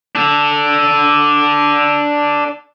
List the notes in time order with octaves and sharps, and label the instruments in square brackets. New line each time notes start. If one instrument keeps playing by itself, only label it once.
[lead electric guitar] D4 A4